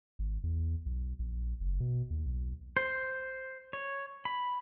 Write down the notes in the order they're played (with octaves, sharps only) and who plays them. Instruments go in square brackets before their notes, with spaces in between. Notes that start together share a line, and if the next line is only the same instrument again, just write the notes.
[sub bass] G#1
E2
B1
A#1
F#1
B2
D#2
B1
[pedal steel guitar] C5
C#5
B5